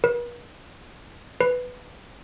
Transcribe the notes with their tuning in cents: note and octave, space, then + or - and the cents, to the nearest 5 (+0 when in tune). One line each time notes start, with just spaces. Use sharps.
B4 -45
B4 +5